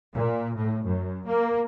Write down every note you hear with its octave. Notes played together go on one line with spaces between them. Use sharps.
A#2
A2
F#2
A#3